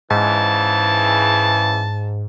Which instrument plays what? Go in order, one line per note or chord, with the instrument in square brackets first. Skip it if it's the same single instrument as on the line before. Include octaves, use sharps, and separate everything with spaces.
[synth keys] G#2 [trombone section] C#3 E3 [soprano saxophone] A5